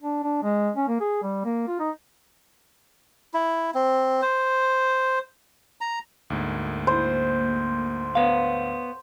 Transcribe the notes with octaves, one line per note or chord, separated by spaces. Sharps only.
D4
D4
G#3
C#4
A#3
G#4
G3
A#3
F4
D#4
E4
C4
C5
A#5
D2 G#2 A#3
C5
B3 C#5 F5